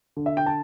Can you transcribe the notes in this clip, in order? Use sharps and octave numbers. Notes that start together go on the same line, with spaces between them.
D3
E5
G5
A5